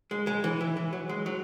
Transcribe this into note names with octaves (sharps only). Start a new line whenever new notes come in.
G#3
G#3
E3
E3
E3
F#3
G#3
F#3